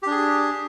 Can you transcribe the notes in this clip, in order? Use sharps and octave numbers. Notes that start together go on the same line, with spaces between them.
D4 G4 G#4